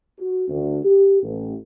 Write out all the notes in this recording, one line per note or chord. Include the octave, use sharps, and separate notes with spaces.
F#4
D2
G4
A1